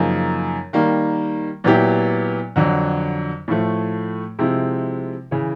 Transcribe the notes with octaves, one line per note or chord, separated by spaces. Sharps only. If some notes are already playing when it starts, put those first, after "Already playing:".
Already playing: F#2 C#3 F3 A#3 D#4
D#3 G3 A#3
A#2 F#3 B3 E4 G4
F2 D3 F#3
A2 F3 A3
C3 F3 G#3 C4 E4
C#3 E3